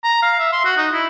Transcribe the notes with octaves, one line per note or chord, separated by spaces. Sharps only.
A#5
F5
E5
C6
F#4
D#4
E4